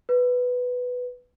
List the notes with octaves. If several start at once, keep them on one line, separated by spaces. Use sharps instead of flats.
B4